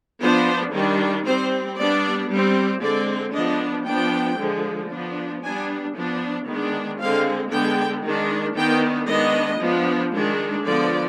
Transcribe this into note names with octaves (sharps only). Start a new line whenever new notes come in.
F3 B3 D4 C5
D#3 G3 D4
G3 C4 C5
G3 B3 D4 D5
G3
C4
D3 G#3 C4 D5
F3 B3 D4 D#5
F3 B3 D4 G5
D3 F3 G#3
F3 B3 D4
G3 B3 D4 G#5
F3 B3 D4
D#3 G#3 B3 D4
D3 G#3 C4 F5
D3 G#3 B3 D4 G5
D#3 G#3 D4
D#3 B3 D4 G5
D#3 G#3 B3 D4 D#5
F3 B3 D4
D#3 G#3 D4
D3 F3 B3 D5